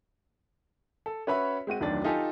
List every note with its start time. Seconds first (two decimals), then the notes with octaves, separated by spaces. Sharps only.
1.06 A4
1.27 C#4 F#4 B4 C#5 E5 B5
1.67 G#3 C4 F#4 D#7
1.80 F1 D2 D#3 F#3 D4 A6
2.04 D#4 F4 G4 A4 G#5